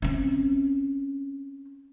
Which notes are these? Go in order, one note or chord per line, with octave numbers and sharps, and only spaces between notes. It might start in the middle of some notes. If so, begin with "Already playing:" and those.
C4 C#4